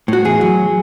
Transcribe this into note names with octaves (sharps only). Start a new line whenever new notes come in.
A2 F#4
E2 G#4
F#3